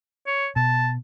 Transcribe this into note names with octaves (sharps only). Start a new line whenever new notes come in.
C#5
B2 A5